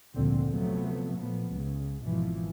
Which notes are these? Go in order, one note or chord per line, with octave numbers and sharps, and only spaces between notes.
F1 D2 A#2 D3 C4
C3 F3 F#3 A3 B3
A#2 F3 B3
C#2 C#3
G#1 B2 E3 F3